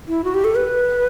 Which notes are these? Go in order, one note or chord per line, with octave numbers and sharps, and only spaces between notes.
E4
F#4
G4
A4
B4